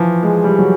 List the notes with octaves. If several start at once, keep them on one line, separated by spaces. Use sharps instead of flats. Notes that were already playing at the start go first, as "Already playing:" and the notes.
Already playing: E3 F3
G#3
G3
F#3